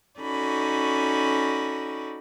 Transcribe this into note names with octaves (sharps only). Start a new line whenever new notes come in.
C#4 D#4 F#4 A4 D5 B5